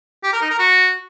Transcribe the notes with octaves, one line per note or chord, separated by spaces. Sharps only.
G4
A#4
D#4
A#4
F#4